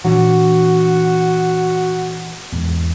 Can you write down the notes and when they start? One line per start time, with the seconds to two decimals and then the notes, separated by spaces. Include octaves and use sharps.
0.04 A#2 E3 D4 F#4
2.52 E2 G#2